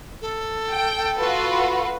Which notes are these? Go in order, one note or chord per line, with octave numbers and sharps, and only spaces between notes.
A4
G5
F4 F#4 B4